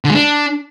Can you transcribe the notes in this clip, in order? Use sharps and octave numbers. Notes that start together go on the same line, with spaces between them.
D3
G#3
D4